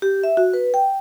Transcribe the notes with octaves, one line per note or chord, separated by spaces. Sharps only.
G4
E5
F#4
B4
G5